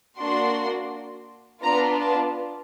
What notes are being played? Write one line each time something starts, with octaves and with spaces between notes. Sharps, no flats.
A#3 D4 F#4 C6
B3 D4 F4 A#5
A5